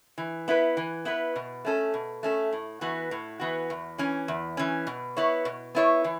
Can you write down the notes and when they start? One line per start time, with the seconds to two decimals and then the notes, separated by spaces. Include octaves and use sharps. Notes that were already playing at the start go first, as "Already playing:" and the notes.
0.18 E3
0.48 B3 E4 B4
0.77 E3
1.05 B3 E4 B4
1.36 B2
1.65 A3 C#4 A4
1.94 B2
2.23 A3 C#4 A4
2.53 A2
2.81 E3 B3 F#4
3.11 A2
3.40 E3 B3 F#4
3.70 E2
3.98 E3 C#4
4.28 E2
4.57 E3 C#4
4.87 B2
5.17 B3 E4 C#5
5.45 B2
5.75 B3 E4 C#5
6.04 E3